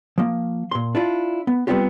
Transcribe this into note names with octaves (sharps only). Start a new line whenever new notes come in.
F3 A#3
A#2 C6
D4 E4 F4
B3
G3 B3 C4 D4 F4 G4